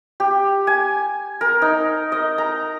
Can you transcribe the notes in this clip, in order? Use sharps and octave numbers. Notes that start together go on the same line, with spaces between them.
G4
G#5
A#4
D#4
D#5
A#5